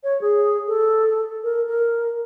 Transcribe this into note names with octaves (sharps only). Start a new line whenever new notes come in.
C#5
G#4
A4
A#4
A#4